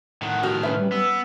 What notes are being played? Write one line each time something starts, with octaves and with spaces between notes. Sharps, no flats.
A2 D#3 F#5
F#4 G4 F6
C#4 B4 E5
G3
B3 E6